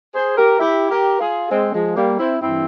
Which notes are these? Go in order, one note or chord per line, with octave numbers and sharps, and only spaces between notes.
G#4 C5
G4 A#4
E4 G4
G4 A#4
F4 G#4
G#3 C4
F3 G#3
G3 A#3
C4 E4
G2 E3 C4 E4